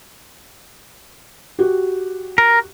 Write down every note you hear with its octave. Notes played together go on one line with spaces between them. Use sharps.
F#4 G4
A#4